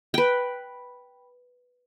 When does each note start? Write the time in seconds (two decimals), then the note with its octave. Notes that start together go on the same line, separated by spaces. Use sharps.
0.14 B4 G5